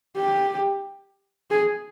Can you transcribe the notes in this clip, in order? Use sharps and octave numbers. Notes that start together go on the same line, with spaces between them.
G4
G#4